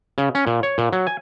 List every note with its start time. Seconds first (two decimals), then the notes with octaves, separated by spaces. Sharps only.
0.18 C#3
0.35 C#4
0.47 A#2
0.63 C#5
0.78 A#2
0.93 F#3
1.07 G#5